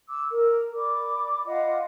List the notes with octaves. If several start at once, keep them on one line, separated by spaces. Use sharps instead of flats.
D6 E6
A#4
D5 B5 D6
F4 D#5 F5 F#5